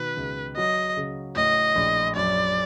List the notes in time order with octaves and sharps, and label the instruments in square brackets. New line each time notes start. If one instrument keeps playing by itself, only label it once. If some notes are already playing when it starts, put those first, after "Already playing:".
Already playing: [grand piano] B2 D#3 [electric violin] B4
[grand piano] C#2
[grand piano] F#3 [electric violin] D#5
[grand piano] C#3
[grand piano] A2 [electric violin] D#5
[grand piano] A#1
[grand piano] F#2 [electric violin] D5